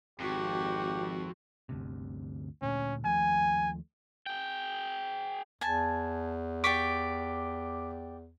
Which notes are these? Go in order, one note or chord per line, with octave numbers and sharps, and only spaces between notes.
G#1 F2 F#4 G4
G1 D2 C3
D2 A#2 C#4
D#2 F3 A3 G#5
G#4 G5
E2 G#5 A5
G4 D5 C#6 D6 B6